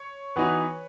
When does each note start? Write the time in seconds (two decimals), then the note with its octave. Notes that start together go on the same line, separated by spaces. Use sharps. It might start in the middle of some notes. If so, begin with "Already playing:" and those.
Already playing: C#5
0.36 E3 B3 D#4 F#4 B4